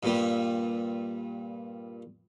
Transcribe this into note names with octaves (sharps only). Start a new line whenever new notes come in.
G2 A#2 G3